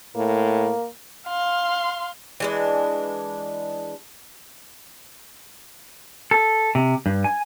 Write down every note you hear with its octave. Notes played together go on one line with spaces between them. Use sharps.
A2 A#3
F5 C6
E3 G#3 D4
A4
C3
G2
G#5